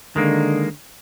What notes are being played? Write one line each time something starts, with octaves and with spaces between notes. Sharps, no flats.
D3 D#3 G#3 A#3